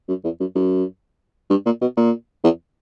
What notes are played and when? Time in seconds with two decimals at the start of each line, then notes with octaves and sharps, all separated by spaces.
0.08 F#2
0.24 E2
0.40 F#2
0.55 F#2
1.50 G2
1.66 A#2
1.81 B2
1.97 A#2
2.44 E2